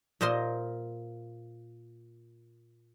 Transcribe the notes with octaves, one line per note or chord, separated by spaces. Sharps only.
A#2 A#4 C5 D#5 C6